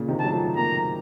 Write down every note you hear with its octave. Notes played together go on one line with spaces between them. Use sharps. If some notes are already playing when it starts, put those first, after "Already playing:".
Already playing: A#2 C#3
C3 D#3
F#3 A5
F3 A3
F#3 A#3 A#5